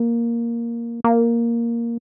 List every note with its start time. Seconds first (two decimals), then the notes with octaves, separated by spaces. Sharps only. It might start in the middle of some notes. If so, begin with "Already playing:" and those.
Already playing: A#3
1.04 A#3